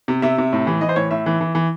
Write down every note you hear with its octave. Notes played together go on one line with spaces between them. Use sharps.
C3
C3 E5
C3
A2
E3
E3 D#5
C5
A2 C#5
A2 E5
E3
E3
E3